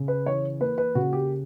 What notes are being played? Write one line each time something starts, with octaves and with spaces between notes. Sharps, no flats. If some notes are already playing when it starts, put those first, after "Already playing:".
Already playing: C#3
B4
E3 C#5
A#3 B4
B4
C#3 F#4
G4